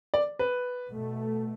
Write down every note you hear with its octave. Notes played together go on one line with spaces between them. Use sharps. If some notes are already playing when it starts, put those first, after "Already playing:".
D5
B4
B2 A3